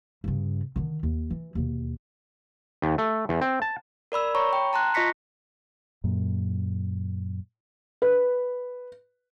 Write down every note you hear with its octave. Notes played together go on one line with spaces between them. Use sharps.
G2 C#3
D3 D#3
D#2
E3
D#2 B2
D#2
A3
E2
C4
A5
A#4 D5 B5 E6
C#5 A#5 B5 C#6
G5
A5 A#5 C6 F#6
F4 D#5 C#6 A#6 B6 C#7
F#2 A#2
B4